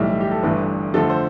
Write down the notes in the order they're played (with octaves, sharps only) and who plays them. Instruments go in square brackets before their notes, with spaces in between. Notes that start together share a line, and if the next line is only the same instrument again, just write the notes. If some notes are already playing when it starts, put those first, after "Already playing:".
Already playing: [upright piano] B1 A2 E3 G3 E5
G4
A4
G1 G2 E3 A3 B4
F2 D3 F3 A3 A4
C5